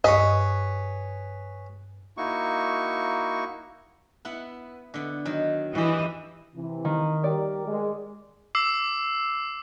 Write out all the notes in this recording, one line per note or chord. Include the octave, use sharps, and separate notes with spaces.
G2 G#4 B4 C#5 D#5
A#3 D#4 E4 F#4 C#6
B3 E4 F#5
D3 B3
D#3 F#3
E3 F#4 G4 D#5
C3 E3
D#3
G3 G4 A#4 D5
G#3
D6 E6 C7